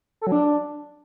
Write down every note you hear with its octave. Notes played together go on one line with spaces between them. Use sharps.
A4
F#3
D4